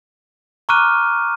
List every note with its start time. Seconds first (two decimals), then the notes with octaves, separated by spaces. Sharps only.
0.69 A#5 C#6 D6 F6 F#6 D#7